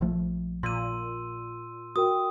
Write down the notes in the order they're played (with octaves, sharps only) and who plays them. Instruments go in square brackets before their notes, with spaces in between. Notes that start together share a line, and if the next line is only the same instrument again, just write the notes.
[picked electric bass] A#1 F3 A3
[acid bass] A#2 [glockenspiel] C6 E6 D#7
[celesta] F#4 A#4 G5 [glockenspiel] D#6